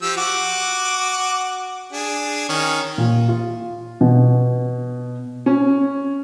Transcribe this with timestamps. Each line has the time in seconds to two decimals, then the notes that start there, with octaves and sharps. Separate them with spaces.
0.02 F3 G4 E6
0.17 F#4 F#5 D6
1.93 D4 G#4
2.49 D#3 C#4
2.98 A#2
3.28 F4
4.01 B2
5.46 C#4